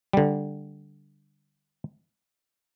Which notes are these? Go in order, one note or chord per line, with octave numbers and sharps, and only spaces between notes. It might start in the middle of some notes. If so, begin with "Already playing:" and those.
D3 G3